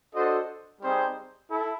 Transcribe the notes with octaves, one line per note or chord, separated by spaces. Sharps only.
D4 F#4 A4 C5 D#5
G3 C4 D#4 G#4 C5
E4 A4